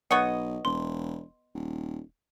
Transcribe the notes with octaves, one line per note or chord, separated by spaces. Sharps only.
B1 B3 C#5 D#5 F#5 C#6
E1 C6
D#1